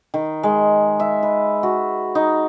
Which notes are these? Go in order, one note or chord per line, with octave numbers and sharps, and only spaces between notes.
D#3
G#3
E5
B4
F#4
D#4